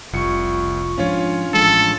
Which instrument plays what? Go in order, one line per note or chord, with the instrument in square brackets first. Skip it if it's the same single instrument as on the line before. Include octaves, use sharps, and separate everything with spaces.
[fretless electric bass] F1 [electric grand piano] C2 C#7 [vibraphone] F4 C#6
[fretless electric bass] G#2 F3 [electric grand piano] C#4 F4 C#5 [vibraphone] D4
[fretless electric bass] A1 F3 G#3 [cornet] A4